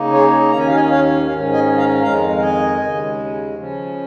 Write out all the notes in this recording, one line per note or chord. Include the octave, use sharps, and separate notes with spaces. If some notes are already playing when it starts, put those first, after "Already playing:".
Already playing: C#3 A#3 D#4
G#4 C#5
D#2 D#3 C#4 A#5
G#5
F5
D#5 G#5
C#5 F5
G#2 D#3 C#4 C#5 F5
D#5 G#5
F5 A#5
F2 D#3 G#3 F5 A#5
F5
D#5 G#5
D#2 C#3 G#3
C#3 F3 C#4